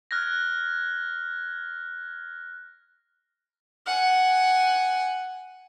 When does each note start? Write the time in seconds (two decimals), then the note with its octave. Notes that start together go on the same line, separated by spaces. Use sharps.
0.11 F6 F#6 G#6 A#6
3.87 F#5 G#5